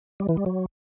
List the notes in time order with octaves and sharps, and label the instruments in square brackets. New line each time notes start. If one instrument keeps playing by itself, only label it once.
[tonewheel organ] G3
E3
G3
F#3